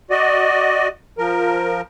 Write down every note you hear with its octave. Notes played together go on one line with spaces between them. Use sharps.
F#4 D5 D#5
F3 A#4